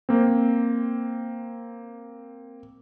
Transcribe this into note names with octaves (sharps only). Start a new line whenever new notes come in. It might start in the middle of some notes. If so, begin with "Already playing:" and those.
A#3 C4